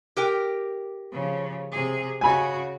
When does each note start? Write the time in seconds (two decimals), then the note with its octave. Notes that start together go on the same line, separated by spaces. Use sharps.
0.17 G4 A#4 G5
1.13 C#3 F3
1.71 C3 G#4
2.21 C#3 F#4 G#5 B5